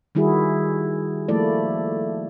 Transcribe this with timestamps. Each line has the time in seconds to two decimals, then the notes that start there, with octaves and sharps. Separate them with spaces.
0.15 D#3 G3 E4 F#4 G#4
1.28 F3 A3 A#3 E4 A4 D5